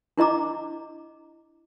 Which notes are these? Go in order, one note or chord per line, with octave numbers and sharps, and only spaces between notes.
D4 E4 D#5 A#5 D6